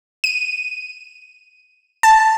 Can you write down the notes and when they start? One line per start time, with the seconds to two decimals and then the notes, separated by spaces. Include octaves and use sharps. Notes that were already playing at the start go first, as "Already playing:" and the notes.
0.24 D#7
2.03 A5